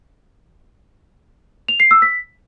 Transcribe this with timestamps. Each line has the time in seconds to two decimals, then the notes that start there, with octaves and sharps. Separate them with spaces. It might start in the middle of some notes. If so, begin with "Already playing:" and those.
1.68 F7
1.80 C7
1.91 E6
2.02 B6